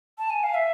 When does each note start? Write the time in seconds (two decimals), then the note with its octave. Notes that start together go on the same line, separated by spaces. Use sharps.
0.18 A5
0.30 G#5
0.43 F5
0.54 E5